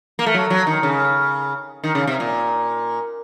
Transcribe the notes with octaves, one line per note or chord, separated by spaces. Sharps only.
A#3
A3
F#3
F#3
D#3
C#3
D#3
C#3
C3
A#2